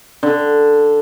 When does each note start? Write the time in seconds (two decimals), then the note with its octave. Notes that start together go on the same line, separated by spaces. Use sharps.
0.23 D3